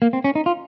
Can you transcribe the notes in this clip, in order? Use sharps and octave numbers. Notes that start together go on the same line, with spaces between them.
A#3
C4
C#4
D#4
F4